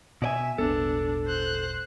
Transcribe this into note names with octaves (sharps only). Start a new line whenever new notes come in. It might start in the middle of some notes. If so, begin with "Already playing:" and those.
B2 D5 E5 G#5
D#1 G#1 B3 D4 A4
C5 F#6